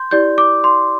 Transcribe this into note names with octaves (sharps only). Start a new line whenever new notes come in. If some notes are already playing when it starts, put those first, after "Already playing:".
Already playing: C6 G6
E4 G4 D5 G6
D6
C6